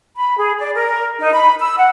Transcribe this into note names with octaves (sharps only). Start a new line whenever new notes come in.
B5
G#4
D5
A#4
D#4
B5
E6
F#5